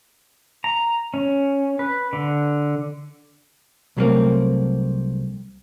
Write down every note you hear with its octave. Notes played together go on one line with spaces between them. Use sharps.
A#5
C#4
B4
D3
C2 F#3 G3 A3 A#3 C4